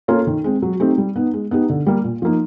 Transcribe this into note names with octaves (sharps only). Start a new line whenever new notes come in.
A#3 C#4 F4 A4
D#3
G#3 C4
F#3
A3 C4 D#4 G4
G3
B3 D#4
G#3
B3 D#4 G4
D3
G3 A#3
A#2
F3 A#3 D#4